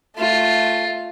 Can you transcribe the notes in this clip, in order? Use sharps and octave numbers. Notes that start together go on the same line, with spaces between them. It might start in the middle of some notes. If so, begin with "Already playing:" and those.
A3 F4